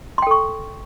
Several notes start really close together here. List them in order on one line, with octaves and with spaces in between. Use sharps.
C6 G5 A4 C#6